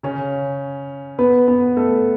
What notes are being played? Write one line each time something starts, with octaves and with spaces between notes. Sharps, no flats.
C#3 C#4
B3 B4
B3 B4
A3 A4